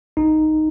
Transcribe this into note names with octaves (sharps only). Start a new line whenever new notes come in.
A#1 D#4